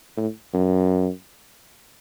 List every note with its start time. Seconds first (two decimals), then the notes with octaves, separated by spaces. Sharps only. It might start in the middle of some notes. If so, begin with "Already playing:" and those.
0.16 A2
0.53 F#2